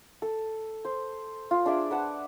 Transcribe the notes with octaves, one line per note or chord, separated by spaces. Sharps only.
A4
C5
F4
D4 G#4 E5 D6
B4 F#5 A5